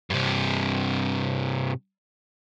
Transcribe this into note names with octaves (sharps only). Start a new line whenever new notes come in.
G2 C3